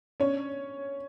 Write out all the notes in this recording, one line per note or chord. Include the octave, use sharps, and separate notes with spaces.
C#4 D4 C#5